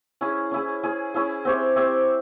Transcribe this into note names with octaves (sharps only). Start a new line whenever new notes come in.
C#4 E4 G#4
C#4 E4 G#4
C#4 E4 G#4
C#4 E4 G#4
C4 G4 C#5 E5
C4 G4 C#5 E5